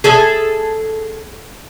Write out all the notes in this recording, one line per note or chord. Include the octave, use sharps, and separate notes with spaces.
G#4 A4 E5